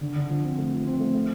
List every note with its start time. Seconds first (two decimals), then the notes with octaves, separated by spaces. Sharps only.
0.01 D3
0.16 D3
0.29 F3
0.43 C4
0.58 A3
0.72 F3
0.86 C4
1.00 A3
1.14 A3